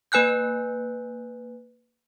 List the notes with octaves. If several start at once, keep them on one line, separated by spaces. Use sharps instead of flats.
A#3 B4 G#5 F#6 G6